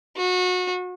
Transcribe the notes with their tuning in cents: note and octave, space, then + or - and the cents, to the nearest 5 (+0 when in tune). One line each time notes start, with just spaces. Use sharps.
F#4 -25